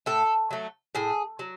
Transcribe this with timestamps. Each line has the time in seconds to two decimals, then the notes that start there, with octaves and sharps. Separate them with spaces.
0.06 A2 A4
0.51 F#3 A3
0.95 A2 G#4
1.39 F#3